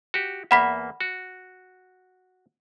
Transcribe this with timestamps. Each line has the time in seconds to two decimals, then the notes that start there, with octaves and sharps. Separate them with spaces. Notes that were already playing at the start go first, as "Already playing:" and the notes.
0.14 F#4 G4
0.51 E2 A#3 E5 F#5 B5 B6
1.01 F#4